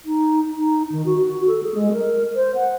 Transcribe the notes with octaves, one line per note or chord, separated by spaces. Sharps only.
D#4
D#4
D#3
F#4
F#4
A4
G#4
G#3
A#4
C5
F#5